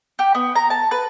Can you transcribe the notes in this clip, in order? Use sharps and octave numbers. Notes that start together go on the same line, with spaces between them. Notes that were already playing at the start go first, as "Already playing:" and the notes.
G4
B3
A#5
A5
B4